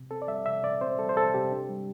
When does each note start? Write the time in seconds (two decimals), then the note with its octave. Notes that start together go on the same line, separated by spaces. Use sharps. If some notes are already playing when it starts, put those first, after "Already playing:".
Already playing: C3
0.11 C4 A4
0.22 D5
0.28 G3 E5
0.46 C3 E5
0.63 C3 D5
0.81 C4 C5
0.99 G3 A4
1.09 C5
1.17 C3 A4
1.34 C3 G4
1.52 D4
1.69 G3